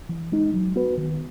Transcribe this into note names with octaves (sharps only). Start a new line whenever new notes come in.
E3
G#3 D#4
F#3
B3 F#4 B4
D#3